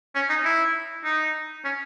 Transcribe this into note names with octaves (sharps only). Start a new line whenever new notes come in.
C#4
D#4
E4
D#4
C#4